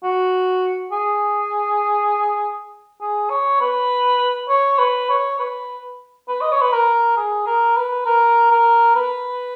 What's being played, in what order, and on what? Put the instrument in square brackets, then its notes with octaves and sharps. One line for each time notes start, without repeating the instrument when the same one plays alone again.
[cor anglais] F#4
G#4
G#4
C#5
B4
C#5
B4
C#5
B4
B4
D#5
C#5
B4
A#4
G#4
A#4
B4
A#4
A#4
B4